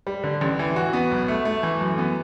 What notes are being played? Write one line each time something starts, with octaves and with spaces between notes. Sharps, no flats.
G3
D3
A1
E3
F#4
B3
B1
A3
A3
E3
F#2
B3